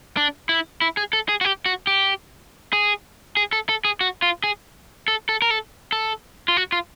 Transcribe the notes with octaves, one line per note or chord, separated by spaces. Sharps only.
D4
E4
E4
G#4
A4
G#4
F#4
G4
F#4
G4
G#4
G#4
A4
A4
G#4
F#4
F4
G#4
A4
A4
A#4
A4
A4
F4
F#4
F4